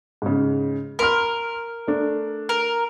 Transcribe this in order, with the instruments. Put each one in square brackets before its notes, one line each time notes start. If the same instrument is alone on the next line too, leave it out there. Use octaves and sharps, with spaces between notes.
[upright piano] G#2 C#3
[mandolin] A#4 [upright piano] B5 C6 F6
[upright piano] A3 D4
[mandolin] A#4